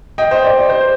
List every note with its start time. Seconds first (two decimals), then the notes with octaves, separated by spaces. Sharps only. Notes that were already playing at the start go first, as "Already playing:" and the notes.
0.18 D#5 G5
0.31 C5 D#5
0.44 D5
0.57 D5
0.70 C5